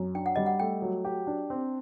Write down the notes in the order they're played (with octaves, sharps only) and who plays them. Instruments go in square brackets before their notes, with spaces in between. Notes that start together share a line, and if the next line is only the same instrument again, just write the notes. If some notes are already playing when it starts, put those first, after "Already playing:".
Already playing: [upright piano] F#2
[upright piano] D4 [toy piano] G5
[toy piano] F#5
[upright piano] G3 [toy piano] D#5
[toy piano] F#5
[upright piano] A3 [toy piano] G5
[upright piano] F#3
G4
D4
C4